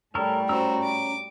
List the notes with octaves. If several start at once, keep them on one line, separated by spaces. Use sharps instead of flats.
A2 G3 A4 A#4 C#5
C#4 F#4 C5 A#5 E6
D6